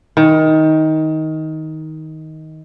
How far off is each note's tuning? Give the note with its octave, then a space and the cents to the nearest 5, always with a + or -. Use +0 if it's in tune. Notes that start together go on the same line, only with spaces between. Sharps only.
D#3 +15